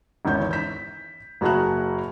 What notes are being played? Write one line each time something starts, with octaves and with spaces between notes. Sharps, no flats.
G#1 E2 C#4 G6
G6 B6
F#1 F#4 G#4 A5 A#5 F#6